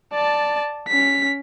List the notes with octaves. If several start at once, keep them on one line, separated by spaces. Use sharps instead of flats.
D5 A5
C#4 B6